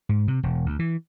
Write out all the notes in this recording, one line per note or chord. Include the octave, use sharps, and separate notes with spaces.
G#2
C3
E1
D2
E3